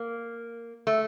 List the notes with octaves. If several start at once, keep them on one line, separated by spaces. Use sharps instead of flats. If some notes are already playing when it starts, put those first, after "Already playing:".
Already playing: A#3
A3